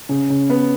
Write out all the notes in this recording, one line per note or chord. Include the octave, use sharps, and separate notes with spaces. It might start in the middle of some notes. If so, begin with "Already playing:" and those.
C#3
C#3
B3